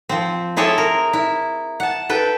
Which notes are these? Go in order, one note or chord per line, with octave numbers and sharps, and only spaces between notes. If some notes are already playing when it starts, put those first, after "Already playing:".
F3 C4
C4 E4 G#4 A4 C#5
A#4
E4
F#5 A5
A4 B4 G5